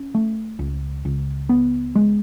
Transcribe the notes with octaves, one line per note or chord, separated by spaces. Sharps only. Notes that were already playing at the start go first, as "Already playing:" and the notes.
Already playing: C#4
A3
C#2
C#2
B3
G#3